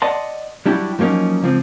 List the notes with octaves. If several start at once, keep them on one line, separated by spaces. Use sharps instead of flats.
D5 D#5 F#5 A5 C6
F#3 G3 D4 E4 F#4 G4
F3 F#3 A#3 C#4 D#4
C#2 F3 C4